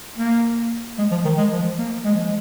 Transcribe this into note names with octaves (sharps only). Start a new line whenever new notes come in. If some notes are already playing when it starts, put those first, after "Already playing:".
A#3
G#3
F3
D#3
G#3
F3
A#3
G#3
F3
G#3